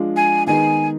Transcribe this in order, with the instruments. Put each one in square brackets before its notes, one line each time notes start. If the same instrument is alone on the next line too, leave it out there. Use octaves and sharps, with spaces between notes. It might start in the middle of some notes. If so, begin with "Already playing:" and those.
Already playing: [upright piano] F3 G#3 D4 F4
[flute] G#5
[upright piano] D#3 G#3 B3 D#4 [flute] G#5